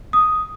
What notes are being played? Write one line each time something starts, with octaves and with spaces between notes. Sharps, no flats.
D#6